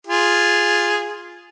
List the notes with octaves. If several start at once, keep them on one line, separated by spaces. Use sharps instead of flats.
F4 G#4